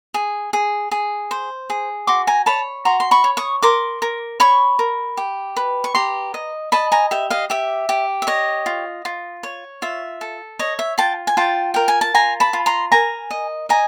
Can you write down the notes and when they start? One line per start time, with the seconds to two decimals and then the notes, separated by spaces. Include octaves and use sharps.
0.14 G#4
0.53 G#4
0.91 G#4
1.31 C5
1.70 G#4
2.07 F#4 C6 D6
2.27 G#5 A#5
2.46 C#5 A5 B5
2.85 F#4 A#5 C6
3.00 C6
3.11 B5 C#6
3.24 C#5
3.37 C#6 D#6
3.62 A#4 C6 D6
4.02 A#4
4.40 C#5 B5 C#6
4.79 A#4
5.17 G4
5.57 B4
5.84 C#6
5.95 G4 A#5 C6
6.34 D#5
6.72 D#5 A5 B5
6.92 G#5 A#5
7.11 G4 E5
7.30 D#5 F5
7.50 G4 E5
7.89 G4
8.22 E5
8.27 C#5 D#5
8.66 F4
9.05 F4
9.43 C#5
9.82 F4 E5
10.21 A4
10.59 C#5 D#5
10.79 E5
10.98 F4 G5 A5
11.27 G#5
11.37 F4 G5 A5
11.74 A#4 G5
11.88 G#5
12.01 A5
12.15 F4 G#5 A#5
12.40 A5 B5
12.53 F4
12.66 A#5 C6
12.92 A#4 G#5 A#5
13.31 D#5
13.69 D#5 G#5 A#5